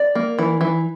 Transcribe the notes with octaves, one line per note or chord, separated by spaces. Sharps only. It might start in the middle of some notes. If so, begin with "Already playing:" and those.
Already playing: D5
A#3
E3
E3